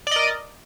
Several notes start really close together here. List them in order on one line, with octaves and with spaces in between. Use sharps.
D5 D#5 A#4